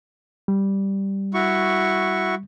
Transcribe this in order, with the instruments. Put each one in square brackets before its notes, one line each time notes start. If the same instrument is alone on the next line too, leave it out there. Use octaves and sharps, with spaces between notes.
[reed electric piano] G3
[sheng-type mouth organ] E4 F#4 C#6